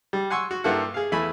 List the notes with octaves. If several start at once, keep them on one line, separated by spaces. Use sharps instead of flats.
G3
F#5 G#5 C6 C#6 E6
F#4
G2 A#3 E4 A4 F#5
G#4 F5
E2 A3 E4 G#5 B5